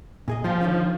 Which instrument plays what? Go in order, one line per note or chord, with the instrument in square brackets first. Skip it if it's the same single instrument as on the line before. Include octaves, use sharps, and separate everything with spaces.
[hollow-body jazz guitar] A#2 G#4 D#5
[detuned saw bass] F3 [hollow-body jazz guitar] G3 G4 C5
[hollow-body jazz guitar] D3 D#3 C#4